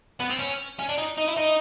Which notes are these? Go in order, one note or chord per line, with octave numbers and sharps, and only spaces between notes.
B3
C4
C#4
C#4
D4
D#4
D#4
E4
D#4